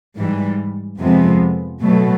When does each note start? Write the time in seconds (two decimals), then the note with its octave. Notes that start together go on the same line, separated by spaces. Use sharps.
0.16 G#2 E3 G3
0.99 F2 C3 F3 G#3 B3
1.82 B2 F#3 A3